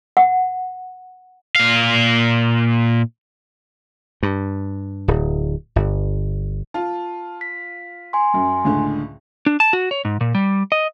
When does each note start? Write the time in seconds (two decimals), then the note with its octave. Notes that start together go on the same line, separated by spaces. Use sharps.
0.17 F#5
1.56 A#2 F5
4.23 G2
5.08 D1
5.76 G1
6.74 F4 A5
7.41 B6
8.13 G#5 C6
8.34 F#2
8.64 C#2 A2 D3
9.46 D4
9.60 A5
9.73 F#4
9.91 C#5
10.05 G#2
10.21 A#2
10.35 G3
10.72 D#5